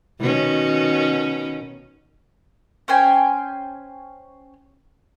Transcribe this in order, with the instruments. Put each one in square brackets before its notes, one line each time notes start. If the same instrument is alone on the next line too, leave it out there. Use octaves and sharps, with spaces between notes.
[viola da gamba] B2 D#3 C#4
[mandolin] C#4 C5 G5 G#5